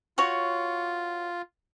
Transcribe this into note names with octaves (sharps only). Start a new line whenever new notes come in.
F4 F#4 C#5